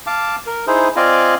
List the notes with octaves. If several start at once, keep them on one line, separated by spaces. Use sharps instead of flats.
F5 A5 D6
A#4
D#4 E4 G#4 C5
C4 F4 D5 D#5 F5 G#5